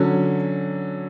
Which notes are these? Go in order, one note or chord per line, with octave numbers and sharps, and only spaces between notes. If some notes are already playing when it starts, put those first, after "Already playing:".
Already playing: D3 F#3 C#4